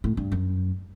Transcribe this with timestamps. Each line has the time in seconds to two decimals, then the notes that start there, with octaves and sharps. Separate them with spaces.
0.04 A2
0.17 G2
0.32 F#2